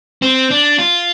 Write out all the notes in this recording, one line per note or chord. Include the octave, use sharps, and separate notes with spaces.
C4
D4
F4